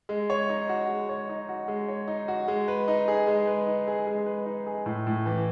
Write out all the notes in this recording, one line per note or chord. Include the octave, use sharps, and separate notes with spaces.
G#3
C#5
D#4
F#4
G#3
C#5
D#4
F#4
G#3
C#5
D#4
F#4
G#3
B4
D#4
G#4
G#3
B4
D#4
G#4
G#3
B4
D#4
G#4
A2
A2
E3